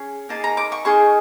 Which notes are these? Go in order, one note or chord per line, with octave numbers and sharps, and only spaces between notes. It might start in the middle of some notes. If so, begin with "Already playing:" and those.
Already playing: C#4 G#4
A#3 D#4 G#4 A5
A#5
D6
C#6
A#3 D#4 G#4 C#6